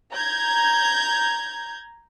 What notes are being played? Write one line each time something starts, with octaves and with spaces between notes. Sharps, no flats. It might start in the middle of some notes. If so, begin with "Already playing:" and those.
A#5 G6 G#6